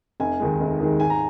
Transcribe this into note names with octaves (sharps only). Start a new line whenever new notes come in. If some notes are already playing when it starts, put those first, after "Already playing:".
F1 G#5
D#2 D#3 G#3
F1
D#2 D#3 G#3
G#2 G#5
A#5